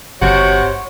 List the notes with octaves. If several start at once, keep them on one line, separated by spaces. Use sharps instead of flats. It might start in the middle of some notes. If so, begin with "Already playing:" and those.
G1 C3 F#4 C#5